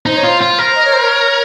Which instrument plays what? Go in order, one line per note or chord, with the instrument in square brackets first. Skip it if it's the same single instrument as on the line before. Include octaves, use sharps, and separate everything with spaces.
[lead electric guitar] D#4 [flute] C5
[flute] C#5
[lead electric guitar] F4 [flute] C5
[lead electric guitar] F4
A#4
[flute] D#5
C#5
C5
C#5